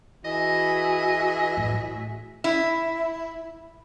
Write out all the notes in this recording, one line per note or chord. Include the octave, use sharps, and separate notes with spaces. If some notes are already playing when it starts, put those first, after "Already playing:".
E3 F#4 G#4 D#5 E5
A2
E4